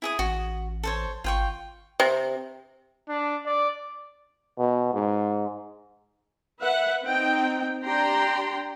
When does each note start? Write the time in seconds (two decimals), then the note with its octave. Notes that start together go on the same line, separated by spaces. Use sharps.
0.02 E4 G#4 D#6
0.19 A1 F#4
0.83 A4 C5 C#5
1.24 G#1 F4 G5 C#6
2.00 C3
3.09 D4
3.46 D5
4.58 B2
4.93 G#2
6.60 B4 E5 F#5
7.04 C4 D#4 G5
7.84 D4 G4 G5 A#5 C6